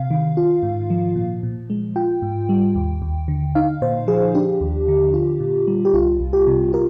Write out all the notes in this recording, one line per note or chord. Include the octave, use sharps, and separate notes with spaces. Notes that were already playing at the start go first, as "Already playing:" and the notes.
Already playing: C3 F5
D#3
F4
G#2
F3
A#2
A#2
G#3
F4 G5
G#2
G3
D#2
D#2
D3
D#4 F5
A#2 C5
F3 G#4
D4 G4
D#2
D3
F4
A#2
G3
G4
C2 F4
C2
G4
C3
F4 A#4